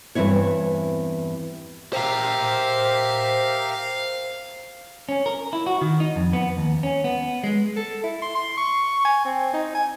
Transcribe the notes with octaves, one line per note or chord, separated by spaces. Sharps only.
E2 G2 E3 C4 E4 C#5
G4 A#4 C5 E5 F5 A#5
C#4
A#4
E4
F#4
D#3
D#4
F2
B3
D#2
C#4
B3
G#3
A4
E4
C6
C6
C#6
G#5
C4
D#4
G#5